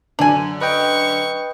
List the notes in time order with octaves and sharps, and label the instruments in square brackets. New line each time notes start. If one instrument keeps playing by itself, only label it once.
[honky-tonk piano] F#2 D3 F#7 [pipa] D4 G#5
[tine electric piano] B4 D#5 G5 [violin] C#6